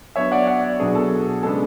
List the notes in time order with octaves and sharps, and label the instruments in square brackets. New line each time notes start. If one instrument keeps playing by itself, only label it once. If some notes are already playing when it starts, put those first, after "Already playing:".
[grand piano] F#3 B3 D4 C#5 E5
D5 F#5
D5 F#5
B2 F#3 B3 D4 G#4
A4
C#3 G#3 B3 D4 A4